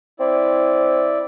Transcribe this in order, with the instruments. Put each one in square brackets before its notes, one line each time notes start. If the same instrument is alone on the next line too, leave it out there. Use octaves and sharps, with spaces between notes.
[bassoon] C4 [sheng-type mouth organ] E4 D5